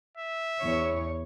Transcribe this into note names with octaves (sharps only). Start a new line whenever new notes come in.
E5
E2 C#5